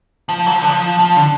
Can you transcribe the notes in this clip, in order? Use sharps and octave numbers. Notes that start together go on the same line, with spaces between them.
F3
F#3
F3
D3
F3
F3
D3